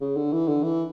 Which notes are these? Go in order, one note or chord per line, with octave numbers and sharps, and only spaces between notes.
C#3
D3
E3
D3
E3